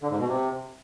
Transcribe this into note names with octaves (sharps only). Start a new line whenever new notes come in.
D3
G#2
B2
C3